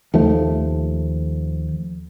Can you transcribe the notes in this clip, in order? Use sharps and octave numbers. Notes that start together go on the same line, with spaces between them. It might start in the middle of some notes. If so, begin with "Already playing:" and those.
D#2 F3 A3